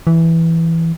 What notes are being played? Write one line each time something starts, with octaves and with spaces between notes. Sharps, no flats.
E3